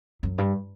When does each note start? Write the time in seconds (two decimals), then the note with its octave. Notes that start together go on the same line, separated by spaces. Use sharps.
0.23 F#2
0.38 G2